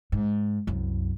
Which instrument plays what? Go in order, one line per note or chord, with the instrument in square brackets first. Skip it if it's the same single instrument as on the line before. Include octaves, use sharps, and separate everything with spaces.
[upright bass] G#2
C2 F#2